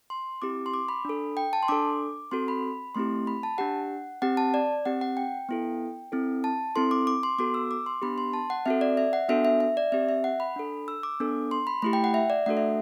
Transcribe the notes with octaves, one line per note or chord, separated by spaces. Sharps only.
C6
C4 E4 G4 D6
C6
D6
B5
D4 A4
G5
A5
C6
D4 A4 D6
C4 F#4 A4 C6
B5
A3 C4 E4 G4 C6
B5
A5
D4 G4 F#5
C4 G4 F#5
A5
D5
C4 G4 F#5
F#5
G5
B3 E4 A4
C4 E4 A4
A5
C4 E4 A4 C6
D6
D6
C6
B3 F#4 A4 D6
E6
D6
C6
B3 D4 G4 B5
C6
A5
F#5
C4 F#4 A4 E5
D5
E5
F#5
B3 D4 F#4 A4 E5
E5
E5
D5
C4 G4 E5
E5
F#5
B5
D4 A4
E6
D6
B3 D4 A4
C6
B5
A3 E4 G4 B5
G5
F#5
E5
D5
A3 D4 F#4 A4 F#5
E5